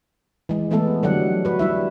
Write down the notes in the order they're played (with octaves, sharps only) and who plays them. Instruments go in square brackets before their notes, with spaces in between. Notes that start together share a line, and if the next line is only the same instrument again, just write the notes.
[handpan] E3 G#3
E3 G#3 A3 B3 A4
D3 F#3 G3 A3 F#5
F#4 B4
G3 E4 E5